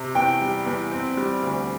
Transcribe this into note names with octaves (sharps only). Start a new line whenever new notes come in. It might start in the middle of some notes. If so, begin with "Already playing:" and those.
Already playing: C3
E2 G5
G3
E2
C4
G3
D2